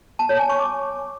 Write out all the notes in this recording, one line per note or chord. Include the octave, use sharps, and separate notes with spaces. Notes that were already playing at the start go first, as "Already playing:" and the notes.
A5
C#5
G#5
C#6
D6